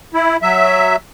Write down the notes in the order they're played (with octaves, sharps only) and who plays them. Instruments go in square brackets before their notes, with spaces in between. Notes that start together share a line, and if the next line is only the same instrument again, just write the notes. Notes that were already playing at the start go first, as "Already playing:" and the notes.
[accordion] E4
F#3 E5